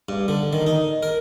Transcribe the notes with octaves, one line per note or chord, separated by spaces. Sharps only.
G2
D3
D#3
D#4
A#4